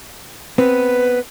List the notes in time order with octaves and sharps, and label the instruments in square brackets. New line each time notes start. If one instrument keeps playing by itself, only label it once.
[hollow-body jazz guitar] B3 C4 [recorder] B4